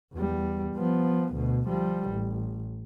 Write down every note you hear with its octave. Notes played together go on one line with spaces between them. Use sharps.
E2 G3
F3 B3
D2 B2
F3 G3
A1